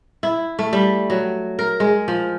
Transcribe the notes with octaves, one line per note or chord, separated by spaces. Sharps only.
E4
A3
G3
F#3
A#4
G#3
F3